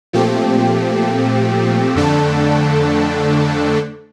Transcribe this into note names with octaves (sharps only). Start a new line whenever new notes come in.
A#2 F3 A3 C4 G4
F2 D3 A3 D4 A4